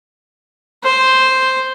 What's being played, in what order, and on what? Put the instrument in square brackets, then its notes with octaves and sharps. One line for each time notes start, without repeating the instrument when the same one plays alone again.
[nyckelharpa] C5